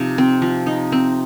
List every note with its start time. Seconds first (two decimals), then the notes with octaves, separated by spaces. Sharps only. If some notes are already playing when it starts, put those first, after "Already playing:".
Already playing: C3 F3 D#4
0.18 C4
0.42 F3
0.66 D#4
0.92 C4